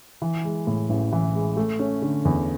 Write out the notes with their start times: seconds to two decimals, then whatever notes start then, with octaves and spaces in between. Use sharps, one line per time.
0.22 E3
0.44 G#3
0.67 A2
0.89 A1
1.13 E3
1.35 G#3
1.57 A3
1.79 C#4
2.02 D3
2.25 E2